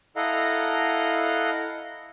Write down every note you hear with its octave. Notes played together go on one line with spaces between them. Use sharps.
E4 A4 D#5 F5 F#5 A#5